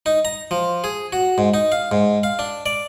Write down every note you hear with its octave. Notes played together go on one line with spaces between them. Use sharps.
D#4
A#5
F3
G#4
F#4
G#2
D#4
F5
G#2
F5
D4
D5